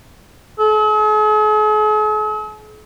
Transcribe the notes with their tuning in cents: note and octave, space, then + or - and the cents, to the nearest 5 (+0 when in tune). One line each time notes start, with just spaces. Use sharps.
G#4 +45